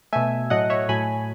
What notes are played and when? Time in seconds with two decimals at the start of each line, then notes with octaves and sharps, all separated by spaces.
0.13 B2 A3 E5 G#5
0.50 A2 F#3 A3 D#5 F#5
0.70 C#5 E5
0.89 A2 F#3 A3 G#5 B5